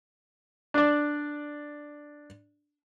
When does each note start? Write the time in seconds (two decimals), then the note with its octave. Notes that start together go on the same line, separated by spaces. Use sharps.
0.74 D4 D5